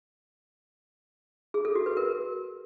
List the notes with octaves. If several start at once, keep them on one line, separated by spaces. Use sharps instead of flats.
G#4
A4
F#4
B4
A#4